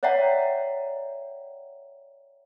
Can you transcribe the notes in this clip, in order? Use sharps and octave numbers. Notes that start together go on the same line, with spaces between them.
C#5 D5 E5 F#5 G5 A#5